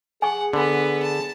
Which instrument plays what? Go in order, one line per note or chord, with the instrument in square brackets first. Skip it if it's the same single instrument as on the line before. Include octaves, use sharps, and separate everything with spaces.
[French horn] G#4 [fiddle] F#5 [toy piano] G#5 C#6
[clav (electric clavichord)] D3 [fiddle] B3 B4
[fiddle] A5